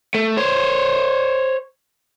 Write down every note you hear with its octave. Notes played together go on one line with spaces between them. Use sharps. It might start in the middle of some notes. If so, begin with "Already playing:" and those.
A3
C5 C#5